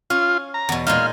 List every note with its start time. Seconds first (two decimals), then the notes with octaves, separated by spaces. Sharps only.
0.10 C#4 F4
0.54 A#5
0.69 E2 B2
0.87 A#2 G#3 D#4 F5